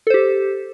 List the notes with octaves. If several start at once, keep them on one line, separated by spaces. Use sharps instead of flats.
G4 A4 C5